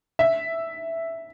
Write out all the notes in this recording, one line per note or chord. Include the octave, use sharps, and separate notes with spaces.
E5